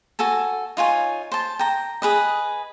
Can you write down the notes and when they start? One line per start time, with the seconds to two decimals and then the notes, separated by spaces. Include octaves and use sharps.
0.19 F#4 A4 G#5 A5
0.77 D#4 F4 C#5 G#5
1.32 C5 A5
1.59 G5 A#5
2.02 G#4 B4 D#5